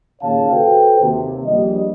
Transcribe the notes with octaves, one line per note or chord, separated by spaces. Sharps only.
D#2 A#2 C#3 C#5 F5 A5
F#4 A4 B4 C5 G5
D#2 C3
A#1 G3 D#5